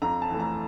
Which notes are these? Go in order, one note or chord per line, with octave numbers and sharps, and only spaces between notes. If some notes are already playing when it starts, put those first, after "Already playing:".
F2 A#5
A5
E3 A3
A#5